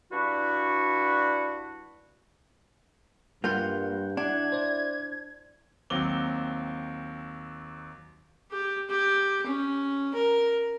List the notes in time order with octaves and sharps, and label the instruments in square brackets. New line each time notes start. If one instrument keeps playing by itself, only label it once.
[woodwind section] G2 D4 E4 F#4
[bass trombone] G2 [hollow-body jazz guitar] G3 A#3 F4 [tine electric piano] F#5 G6
[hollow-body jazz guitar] D4 [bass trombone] E4 [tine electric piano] F#5 [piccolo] G#6
[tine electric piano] C5 D5
[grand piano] D#2 F#3 C4 D6 G7
[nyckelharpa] G4
G4
C#4
A#4